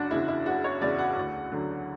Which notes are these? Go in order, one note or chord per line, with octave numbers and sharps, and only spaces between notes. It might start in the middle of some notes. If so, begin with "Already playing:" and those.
Already playing: F#1 D4 F#4
E2 C#3 E4
E4
F#1 F#4
C#5
E2 C#3 D5
F#5
D2
D3 F#3